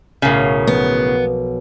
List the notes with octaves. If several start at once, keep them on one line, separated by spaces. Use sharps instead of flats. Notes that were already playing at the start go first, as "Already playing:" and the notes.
B1 A2 C#3 A#4 F5
F3 B3